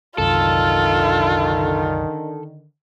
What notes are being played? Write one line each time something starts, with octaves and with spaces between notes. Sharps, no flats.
C2 F#2 D3 D#3 F4 A4